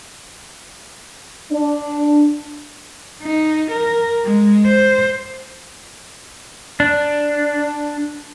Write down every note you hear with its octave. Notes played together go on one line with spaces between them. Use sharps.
D4
D#4
A#4
G#3
C5
D4